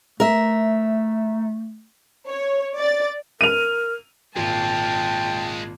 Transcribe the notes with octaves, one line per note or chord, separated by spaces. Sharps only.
A3 A#4 E5
C#5
D5 A6
A#4 D#7 F7
G#1 A#2 G#3 F4 G5 A5